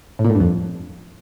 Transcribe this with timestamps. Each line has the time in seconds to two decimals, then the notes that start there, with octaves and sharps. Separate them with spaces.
0.19 A2
0.24 A#2
0.30 A2
0.35 G2
0.40 F2